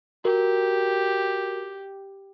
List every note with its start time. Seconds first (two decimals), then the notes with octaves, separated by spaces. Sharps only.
0.25 F#4 G4 A#4